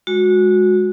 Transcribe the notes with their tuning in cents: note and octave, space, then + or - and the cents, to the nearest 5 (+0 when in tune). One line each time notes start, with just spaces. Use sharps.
G#3 +0 F#4 -20